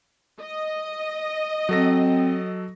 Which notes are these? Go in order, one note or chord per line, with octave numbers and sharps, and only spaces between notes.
D#5
F#3 C4 A4 A#6